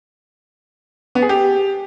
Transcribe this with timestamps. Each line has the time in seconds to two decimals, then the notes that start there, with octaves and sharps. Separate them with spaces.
1.15 B3
1.22 G#4
1.29 G4